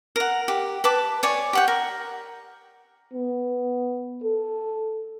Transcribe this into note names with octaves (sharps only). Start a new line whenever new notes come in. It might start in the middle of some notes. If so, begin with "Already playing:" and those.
A#4 F#5
G4
B4 A5 D6
C#5 D5 G#5
G4 F#5 G5
A#4
B3
A4